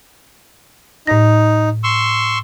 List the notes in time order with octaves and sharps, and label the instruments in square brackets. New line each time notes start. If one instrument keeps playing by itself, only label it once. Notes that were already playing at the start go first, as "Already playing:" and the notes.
[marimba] A2 A#6 [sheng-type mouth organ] D#4
[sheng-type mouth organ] C6 C#6 E6